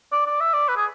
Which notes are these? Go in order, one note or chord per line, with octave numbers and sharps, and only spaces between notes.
D5
D5
E5
D5
B4
G#4